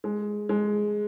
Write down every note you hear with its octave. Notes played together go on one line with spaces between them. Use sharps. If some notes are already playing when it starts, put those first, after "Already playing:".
G#3
G#3